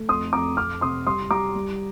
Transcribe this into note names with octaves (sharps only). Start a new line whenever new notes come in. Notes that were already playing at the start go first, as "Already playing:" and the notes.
Already playing: A3
F2 C6 D#6
F2 A#5 D6
F2 D6 F6
C3 C6 D#6
G3 C6 D#6
G3 A#5 D6
G3